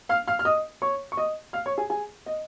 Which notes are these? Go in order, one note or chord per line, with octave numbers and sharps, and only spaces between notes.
F5 F6
F5 F6
F6
D#5 D#6
C#5 C#6
C#6
D#5 D#6
F5 F6
C#5 C#6
G#4 G#5
G#4 G#5
D#5